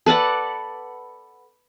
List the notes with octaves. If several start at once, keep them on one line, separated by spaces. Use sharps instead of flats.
A4 B4 D5 F#5